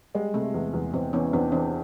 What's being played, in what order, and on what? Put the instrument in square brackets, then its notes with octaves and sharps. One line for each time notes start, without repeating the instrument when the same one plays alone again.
[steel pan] G3 [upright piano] G#3
[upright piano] C3 [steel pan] A3
[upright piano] E2
E2
[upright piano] E2 [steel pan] C4
[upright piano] E3 [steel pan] B3 C#4
[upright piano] E2 [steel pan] C4 D4
[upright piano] E3 [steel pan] C4 D4